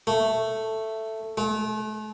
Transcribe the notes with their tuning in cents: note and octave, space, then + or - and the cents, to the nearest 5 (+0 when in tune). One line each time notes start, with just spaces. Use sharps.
A3 +5
A3 -40